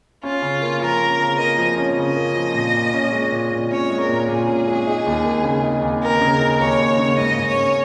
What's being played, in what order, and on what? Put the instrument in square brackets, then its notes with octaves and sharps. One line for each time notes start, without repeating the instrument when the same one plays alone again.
[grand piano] C#4 [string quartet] F4
[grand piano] C#3
A#3
[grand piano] F3 [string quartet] A#4
[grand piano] C#4
C#3
[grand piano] A#3 [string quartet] D#5
[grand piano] F3
C#4
[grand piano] C#3 [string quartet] D#5
[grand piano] A#3
F3
A#2
A#2
C#4
G#3
A#2
A#2
[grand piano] C#4 [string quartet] C#5
[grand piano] G#3
[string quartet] A#4
[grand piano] A#2
[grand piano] A#2 [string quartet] G#4
[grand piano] C#4
G#3
D#4
D#2
A#3
C#3
D#4
D#2
[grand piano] A#3 [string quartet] A#4
[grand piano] C#3
D#4
[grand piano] D#2 [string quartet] C#5
[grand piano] A#3
C#3
[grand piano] G#2 [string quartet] D#5
[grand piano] G#2
[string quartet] C#5
[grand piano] C#4